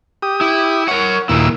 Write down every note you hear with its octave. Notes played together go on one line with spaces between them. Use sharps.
G4 D#6
E4
A#4 C#5 F#5
D#2 A#2 A#3 E4 E6